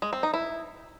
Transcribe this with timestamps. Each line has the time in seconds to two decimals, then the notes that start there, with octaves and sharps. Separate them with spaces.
0.02 G#3
0.13 C4
0.23 D#4
0.34 E4